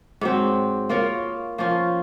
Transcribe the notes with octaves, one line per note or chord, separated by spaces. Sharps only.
G#2 F#3 C4
A#3 F4 A#4 C#5
F3 A#3 C#4 F4